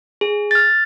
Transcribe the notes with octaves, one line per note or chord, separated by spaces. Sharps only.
G#4
F6 A6